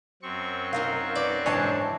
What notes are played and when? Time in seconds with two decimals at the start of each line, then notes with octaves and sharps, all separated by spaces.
0.22 F#2 C4 C#6
0.73 D#4 A#4 F5
1.16 B4 D5
1.46 G#2 E3 D4 C#5 G#5 A5